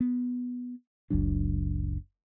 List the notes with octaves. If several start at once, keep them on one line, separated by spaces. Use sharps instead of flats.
B3
F#1 C#2 F#3 D4